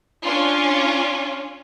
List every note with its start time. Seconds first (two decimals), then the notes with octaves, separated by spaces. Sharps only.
0.23 C#4 D4 F4